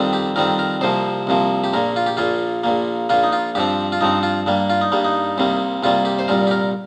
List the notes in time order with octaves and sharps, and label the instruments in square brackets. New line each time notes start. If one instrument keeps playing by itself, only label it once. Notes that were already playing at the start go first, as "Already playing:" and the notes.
Already playing: [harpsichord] F2 D#3 G3 C4
G4
F2 D#3 G3 C4 A#4
A#4
C2 C3 F3 A#3 C5
C2 C3 F3 A#3
G4
A#1 A#2 A#3 A#4
F4
G4
A#1 A#2 A#3 F4
A#1 A#2 A#3
A#1 A#2 A#3 F4
D#4
F4
G2 F3 C4 G4
F4
G2 F3 C4 D#4
F4
G2 G3 A#3
F4
D#4
G2 G3 A#3
D#4
C2 C3 G3 A#3
C2 C3 G3 A#3 F4
G4
C5
C2 A#2 G3 A#4
G4
A#4